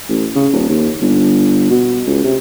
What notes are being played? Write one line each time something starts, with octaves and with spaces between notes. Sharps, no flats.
A1
C#3
D#1
D#2
G1
B2
C#2
C3